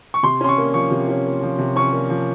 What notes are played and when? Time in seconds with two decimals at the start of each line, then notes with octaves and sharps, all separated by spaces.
0.14 C#6
0.23 C3 C6
0.41 C#4 C6
0.49 C#6
0.58 A#3
0.74 F3 C#6
0.91 C3
1.09 C#4
1.26 A#3
1.43 F3
1.59 C3
1.76 C#4 C#6
1.93 A#3
2.10 F3